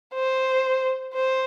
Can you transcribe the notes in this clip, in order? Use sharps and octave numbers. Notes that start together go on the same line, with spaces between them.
C5
C5